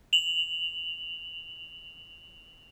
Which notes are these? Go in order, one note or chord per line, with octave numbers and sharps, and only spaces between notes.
F7 F#7